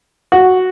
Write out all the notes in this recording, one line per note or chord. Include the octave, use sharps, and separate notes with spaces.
F#4